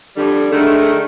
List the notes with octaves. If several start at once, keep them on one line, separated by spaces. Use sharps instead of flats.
F2 D3 G3
D3 D#3 G#3 A3